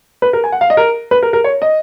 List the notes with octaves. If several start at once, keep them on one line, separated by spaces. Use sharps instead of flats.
B4
A#4
G#5
F#5
F5
D#5
A#4
B4
A#4
A#4
C#5
D#5